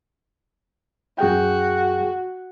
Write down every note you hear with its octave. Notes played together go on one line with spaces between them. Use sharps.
F#2 F#4 G#4 G5